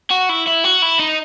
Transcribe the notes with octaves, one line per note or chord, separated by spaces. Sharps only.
F#4
E4
E4
F#4
E4
D#4